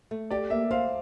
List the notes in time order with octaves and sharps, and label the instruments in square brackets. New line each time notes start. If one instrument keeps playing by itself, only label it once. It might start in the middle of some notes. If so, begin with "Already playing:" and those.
[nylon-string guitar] A3
[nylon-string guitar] G4 [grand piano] D5
[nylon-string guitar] A#3 [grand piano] E5
[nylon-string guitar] C5 [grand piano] F5